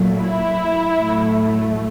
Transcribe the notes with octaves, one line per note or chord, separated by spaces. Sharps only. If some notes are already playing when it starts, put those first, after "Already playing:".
Already playing: A#2 F#3 A3
E4
A2 F#3 A3